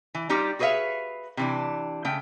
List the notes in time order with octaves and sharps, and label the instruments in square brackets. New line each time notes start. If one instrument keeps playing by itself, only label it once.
[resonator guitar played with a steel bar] E3
G3 D#4 F4 G4
F#4 G#4 B4 C#5 E5 F5
C3 E3 D4
C#3 A3 G5